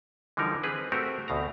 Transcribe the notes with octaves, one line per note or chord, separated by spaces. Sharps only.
D3 E3 F3 G3 D#4 A#4
C4 G#4 B4
A3 C4 F#4 G4 A#4
D2 B2 F5 A#5